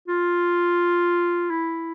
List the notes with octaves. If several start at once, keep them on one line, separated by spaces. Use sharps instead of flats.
F4
E4